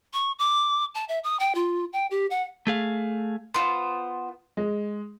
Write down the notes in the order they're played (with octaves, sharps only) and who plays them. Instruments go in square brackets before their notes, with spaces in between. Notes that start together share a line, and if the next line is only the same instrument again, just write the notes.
[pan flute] C#6
D6
A5
E5
D#6
G5
F4
G5
G4
F#5
[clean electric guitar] A3 G#4 F5
[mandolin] B3 F4 C5 [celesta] C6
[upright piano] G#3